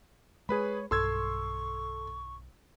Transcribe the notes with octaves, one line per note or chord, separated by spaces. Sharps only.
G#3 G#4 B4 C#5 B5
B1 G2 A4 C6 C#6 E6 G#6